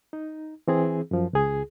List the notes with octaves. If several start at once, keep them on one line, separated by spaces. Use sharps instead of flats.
D#4
E3 C4 G#4
F#2 F3
C#2 G#4